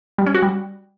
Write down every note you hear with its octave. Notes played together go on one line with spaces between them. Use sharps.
G3
C#4
F#4
G3